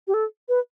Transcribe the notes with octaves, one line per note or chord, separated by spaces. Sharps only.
G4
A4
B4